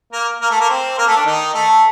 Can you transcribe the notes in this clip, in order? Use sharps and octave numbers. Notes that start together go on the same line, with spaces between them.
A#3 A#4
A#3 A#4
A3 A4
A#3 A#4
C4 C5
A#3 A#4
A3 A4
D4
D#3 D#4
A3 A4